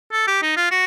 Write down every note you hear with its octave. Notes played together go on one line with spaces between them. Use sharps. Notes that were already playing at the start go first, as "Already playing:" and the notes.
A4
G4
D#4
F4
F#4